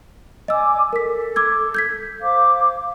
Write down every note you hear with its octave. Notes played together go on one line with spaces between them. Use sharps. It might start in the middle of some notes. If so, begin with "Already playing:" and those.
D5 D#5 G#5 D6 E6
A4 A#4 B6
D6 E6 G#6
G6 G#6 B6
C5 F5 D6